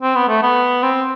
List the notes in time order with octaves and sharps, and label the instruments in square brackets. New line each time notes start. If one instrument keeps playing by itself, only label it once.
[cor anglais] C4
B3
A3
B3
C4